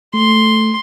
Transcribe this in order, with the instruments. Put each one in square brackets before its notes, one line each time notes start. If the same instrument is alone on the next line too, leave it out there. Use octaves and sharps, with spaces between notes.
[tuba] A3 [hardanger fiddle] C6